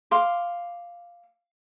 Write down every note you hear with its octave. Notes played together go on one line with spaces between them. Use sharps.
F5 C6 D6